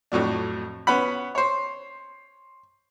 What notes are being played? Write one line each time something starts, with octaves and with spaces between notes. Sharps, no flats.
F2 A2 F#3 D4
B3 C#4 F#5 B5
C5 C#5